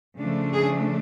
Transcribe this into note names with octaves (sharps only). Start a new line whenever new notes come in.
C#3 F3 A3 D4
G#4